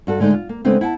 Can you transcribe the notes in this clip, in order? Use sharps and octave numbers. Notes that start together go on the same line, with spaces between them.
G2 F#4 A4
D3 G#3 A3 D4 D#4
F4
A#3
C#3 G#3 A3 B3 C4 D4
E4 F#5 G#5 A5